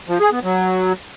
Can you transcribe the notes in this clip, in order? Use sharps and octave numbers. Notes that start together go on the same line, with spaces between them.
F3
G#4
B3
F#3